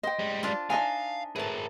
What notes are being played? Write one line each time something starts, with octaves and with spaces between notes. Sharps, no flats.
C5 D#5 G5
G3 G#3
D4 F4
D4 D#4 E5 F5 G#5 A5
A2 G#4 A#4 B4 A5